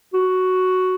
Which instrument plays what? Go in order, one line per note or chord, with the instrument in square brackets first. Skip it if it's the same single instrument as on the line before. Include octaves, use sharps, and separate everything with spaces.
[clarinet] F#4